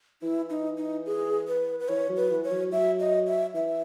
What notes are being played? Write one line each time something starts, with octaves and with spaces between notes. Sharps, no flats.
E3 E4
D#4
D#4
G#4
B4
B4
E3 C#5
F#3
B4
E3
C#5
F#3
F#3 E5
D#5
E5
E3 E5